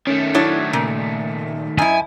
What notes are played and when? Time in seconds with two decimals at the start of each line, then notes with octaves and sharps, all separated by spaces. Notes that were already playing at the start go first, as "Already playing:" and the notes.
0.07 D#3 A3 C#4
0.34 F#3 D4 E4 C#5
0.73 A#2 C#3
1.78 F#2 E4 D#5 G#5